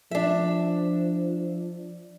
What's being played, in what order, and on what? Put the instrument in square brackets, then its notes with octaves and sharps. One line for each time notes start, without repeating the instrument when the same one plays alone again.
[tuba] F3 [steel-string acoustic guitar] D4 E5